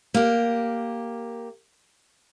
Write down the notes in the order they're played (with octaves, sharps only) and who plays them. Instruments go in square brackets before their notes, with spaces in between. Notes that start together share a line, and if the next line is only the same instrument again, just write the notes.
[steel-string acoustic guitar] A#3 G4